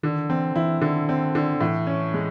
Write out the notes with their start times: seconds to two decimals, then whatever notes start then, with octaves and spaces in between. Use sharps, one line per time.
0.03 D3 D#3
0.29 E3 C4
0.56 E3 E4
0.82 D3 D#3
1.09 C4
1.35 D3
1.61 A2 E3
1.87 C#4
2.14 G#3